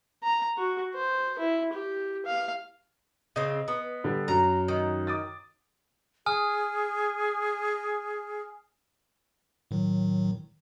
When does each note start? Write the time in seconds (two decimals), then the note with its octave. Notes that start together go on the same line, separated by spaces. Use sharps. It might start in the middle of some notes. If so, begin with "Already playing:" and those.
0.23 A#5
0.57 F#4
0.94 C5
1.39 E4
1.73 G4
2.26 F5
3.36 C#3 C4 D#5
3.68 B3
4.04 D3 G3
4.28 F#2 A#5
4.68 D#3
5.07 D6 D#6 A6
6.26 G#4 G#5 D#6 F6
9.71 A2 D#3 F#3